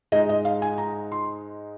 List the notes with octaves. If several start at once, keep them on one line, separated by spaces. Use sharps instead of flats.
G#2 G#3 D#4 D#5
D#5
F5
G#5
A#5
C6